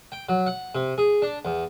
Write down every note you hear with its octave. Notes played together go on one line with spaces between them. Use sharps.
G5
F#3
F#5
C3
G#4
D4
E2